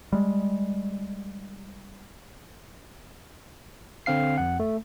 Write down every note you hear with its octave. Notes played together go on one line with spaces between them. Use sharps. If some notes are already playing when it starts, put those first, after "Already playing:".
G3 G#3
D3 C4 F5 C7
F2 F#5
A3